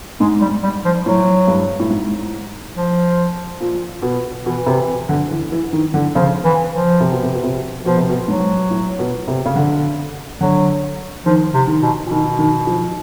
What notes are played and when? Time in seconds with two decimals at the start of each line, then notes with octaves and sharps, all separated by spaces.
0.20 G#2 G#3
0.41 G3
0.63 G3
0.84 F3
1.06 A2 F#3
1.48 G2
1.80 A2
1.90 G#2
2.76 F3
3.60 A#2
4.02 B2
4.45 B2 E3
4.66 C3
5.09 D3
5.31 E3
5.52 E3
5.73 D#3
5.94 D3
6.15 C#3 F3
6.44 E3
6.72 F3
7.00 C3
7.12 B2
7.23 C3
7.35 B2
7.43 C3
7.85 B2 F3
7.97 C3
8.09 B2
8.27 G#2 F#3
8.70 A2
8.99 B2
9.28 C3
9.46 C#3
9.56 D3
10.41 D3 F#3
11.25 D#3 F3
11.54 C3
11.68 D#3
11.82 B2
12.06 A#2
12.10 B2 D#3
12.39 D#3
12.67 F3